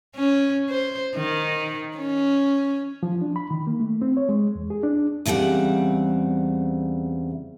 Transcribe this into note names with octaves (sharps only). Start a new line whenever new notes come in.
C#4
C5
D#3
C#4
F3
D4
B5
D#3
A#3
A3
C4
C#5
G#3
E2
G#4
D4
E2 C#3 G3 C4 F#5